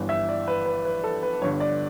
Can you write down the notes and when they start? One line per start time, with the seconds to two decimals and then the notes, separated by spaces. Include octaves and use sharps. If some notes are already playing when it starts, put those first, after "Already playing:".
Already playing: G1 G2 E3
0.09 E5
0.29 D5
0.48 B4
0.66 B4
0.85 B4
1.04 A4
1.23 B4
1.42 G1 G2 D3 C#5
1.60 D5